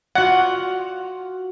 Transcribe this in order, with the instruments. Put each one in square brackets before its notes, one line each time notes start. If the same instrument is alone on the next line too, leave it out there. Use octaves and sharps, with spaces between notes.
[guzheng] F4 F#4 D5 [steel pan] F#5